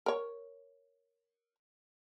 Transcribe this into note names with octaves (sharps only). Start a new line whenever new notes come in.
A#4 C#5